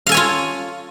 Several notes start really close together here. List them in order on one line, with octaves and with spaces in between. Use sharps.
F5 A4 G#5 C#5 F4